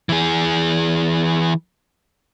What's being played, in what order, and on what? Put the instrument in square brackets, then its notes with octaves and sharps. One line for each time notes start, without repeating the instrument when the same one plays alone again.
[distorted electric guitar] E3 G#4